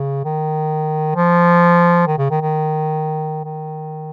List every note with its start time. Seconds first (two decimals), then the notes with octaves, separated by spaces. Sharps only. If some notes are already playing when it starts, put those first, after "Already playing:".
Already playing: C#3
0.25 D#3
1.15 F3
2.07 D#3
2.18 C#3
2.30 D#3
2.42 D#3
3.45 D#3